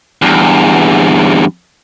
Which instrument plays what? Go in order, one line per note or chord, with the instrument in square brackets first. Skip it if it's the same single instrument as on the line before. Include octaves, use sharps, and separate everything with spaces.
[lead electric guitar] E2 G2